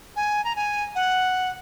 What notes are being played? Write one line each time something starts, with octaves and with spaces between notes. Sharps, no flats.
G#5
A#5
G#5
F#5